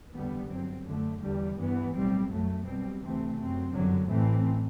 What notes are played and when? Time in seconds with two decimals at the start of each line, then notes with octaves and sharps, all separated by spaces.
0.13 F#1 E2 D3 G3 B3
0.49 G1 G2 F#3 C4
0.85 F#2 D3 A3
1.21 E2 D3 G3
1.57 G2 E3 B3
1.94 B1 A2 G3 C4
2.29 F#2 F#3 A3
2.66 B1 B2 G3 C4
3.02 D2 C3 E3 A3 C4
3.38 F#2 F#3 C4
3.74 G1 F#2 D3 F#3
4.10 A1 A2 E3 A3 C4